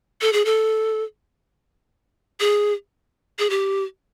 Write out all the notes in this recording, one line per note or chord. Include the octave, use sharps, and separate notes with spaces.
A4
G#4
A4
G#4
G#4
G4